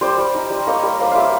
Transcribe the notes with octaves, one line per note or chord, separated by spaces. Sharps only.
G3 C5 D5
G3
D#4
G3
A#3 C#5 D#5
G3
A#3 C5 D5
G3 D5 E5 F5